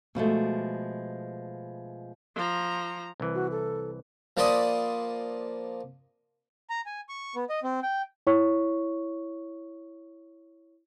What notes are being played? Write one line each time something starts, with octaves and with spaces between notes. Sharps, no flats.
B2 F3 G#3 A3
F3 A#5
C2 E3
F#4
A4
F3 A#3 D5 B5 C6 D#6
A#5
G#5
C#6
B3
D#5
C4
G5
E4 C#5 C#6